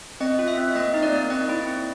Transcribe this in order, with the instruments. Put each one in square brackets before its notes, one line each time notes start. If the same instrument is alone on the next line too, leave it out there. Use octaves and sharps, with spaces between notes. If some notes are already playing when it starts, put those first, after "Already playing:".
[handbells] C4 D#5
F4
E5
C4
A#3 D#5
D#4
D5
A#3
C4 D#5
E4
C4